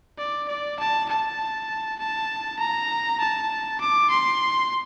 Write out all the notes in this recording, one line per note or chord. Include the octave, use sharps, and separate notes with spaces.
D5
D5
A5
A5
A5
A#5
A5
D6
C6